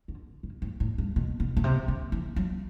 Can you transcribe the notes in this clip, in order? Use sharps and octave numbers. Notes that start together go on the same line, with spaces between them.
D3
B2
A2
A2
G2
B2
B2
B2
C3
D3
E3
F#3